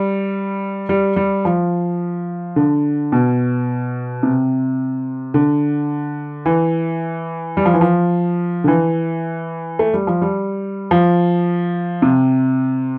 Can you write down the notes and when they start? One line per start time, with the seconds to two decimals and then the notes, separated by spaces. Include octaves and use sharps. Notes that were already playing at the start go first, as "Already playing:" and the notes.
Already playing: G3
0.89 G3
1.16 G3
1.45 F3
2.56 D3
3.12 B2
4.23 C3
5.34 D3
6.46 E3
7.57 G3
7.65 F3
7.74 E3
7.81 F3
8.64 D3
8.68 E3
9.79 A3
9.94 G3
10.07 F3
10.22 G3
10.91 F3
12.02 C3